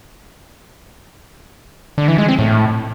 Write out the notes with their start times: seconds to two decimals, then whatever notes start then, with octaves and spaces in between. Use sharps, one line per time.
1.98 D3
2.08 E3
2.18 G#3
2.28 C4
2.39 A2